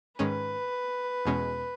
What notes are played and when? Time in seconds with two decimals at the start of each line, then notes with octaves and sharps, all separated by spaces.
0.19 G#2 D#3 G#3 C#4 B4
1.25 E2 B2 G#3 C#4